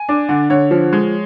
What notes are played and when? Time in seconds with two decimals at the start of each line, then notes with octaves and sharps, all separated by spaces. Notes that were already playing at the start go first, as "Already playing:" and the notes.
Already playing: G#5
0.09 D4
0.29 D3
0.50 D3 C#5
0.71 F3
0.93 G#3